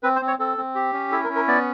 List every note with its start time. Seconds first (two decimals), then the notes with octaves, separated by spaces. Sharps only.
0.03 C4 B4
0.16 C5
0.21 C4
0.27 C#5
0.39 C4 A4
0.57 C4
0.75 G4
0.93 C#4
1.11 E4 A4
1.24 A#4
1.29 C#4
1.35 A#4
1.48 B3 D5